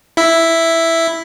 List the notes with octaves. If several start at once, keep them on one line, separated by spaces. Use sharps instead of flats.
E4 E5